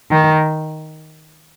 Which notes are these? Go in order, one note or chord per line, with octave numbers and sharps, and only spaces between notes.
D#3